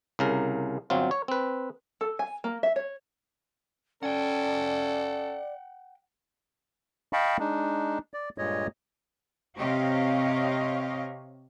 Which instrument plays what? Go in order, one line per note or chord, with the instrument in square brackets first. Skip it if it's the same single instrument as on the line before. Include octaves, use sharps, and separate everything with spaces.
[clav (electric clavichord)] C2 C#3 A#4
G1 F#3 C4 F4
C#5
C4 B4
[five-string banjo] A4
G#5
A#3
E5
C#5
[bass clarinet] C#4 [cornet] A4 [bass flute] D5 [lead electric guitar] F#5 G5
[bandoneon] D#5 F5 G5 A5 B5 C#6
G#3 D4 D#4
D5
G2 A#2 G#3 C#5 D#5
[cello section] C3 C4 G4 C#5 D#5 F5